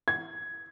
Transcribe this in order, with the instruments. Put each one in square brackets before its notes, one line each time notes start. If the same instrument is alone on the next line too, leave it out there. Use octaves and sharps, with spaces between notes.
[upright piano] G#6